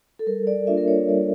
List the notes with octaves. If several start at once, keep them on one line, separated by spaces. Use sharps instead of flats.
A4
G3 A#4
D5
A#3 D4 F4 E5
A#4
C#5
G3 D5